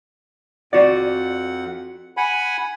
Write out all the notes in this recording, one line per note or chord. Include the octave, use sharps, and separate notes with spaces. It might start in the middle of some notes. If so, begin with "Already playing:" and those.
F2 F#4 D5 F#5
F#5 G#5 B5